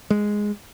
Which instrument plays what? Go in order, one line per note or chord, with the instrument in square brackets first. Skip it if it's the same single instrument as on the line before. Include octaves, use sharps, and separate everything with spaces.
[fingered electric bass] G#3